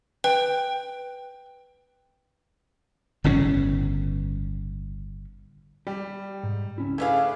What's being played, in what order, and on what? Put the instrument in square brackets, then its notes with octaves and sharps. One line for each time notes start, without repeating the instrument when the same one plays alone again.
[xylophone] B4 [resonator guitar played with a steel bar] G5
[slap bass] G1 A2 C#3 C#4
[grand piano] G3 [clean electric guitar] G4
[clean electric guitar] G#2
C#2 C#4 E4
[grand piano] A3 D4 G#4 [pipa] E4 B4 F5 [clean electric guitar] G#5